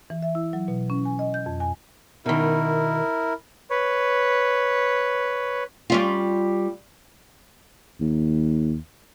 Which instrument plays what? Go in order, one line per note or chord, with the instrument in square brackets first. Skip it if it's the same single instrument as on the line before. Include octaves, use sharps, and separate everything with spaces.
[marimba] E3
E5
E4
F#3
B2
C#4
G#5
D#5
G6
F2
G#5
[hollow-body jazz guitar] B2 D#3 [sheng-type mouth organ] E4 A#4
[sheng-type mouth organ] B4 C#5
[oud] G3 C#4 F4
[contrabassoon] D#2